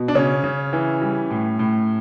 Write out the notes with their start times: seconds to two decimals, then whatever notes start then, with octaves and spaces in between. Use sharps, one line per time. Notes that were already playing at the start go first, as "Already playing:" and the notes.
Already playing: B2
0.08 D4
0.15 C#3 C#4
0.44 C#3
0.73 E3
1.02 G3
1.31 A2
1.59 A2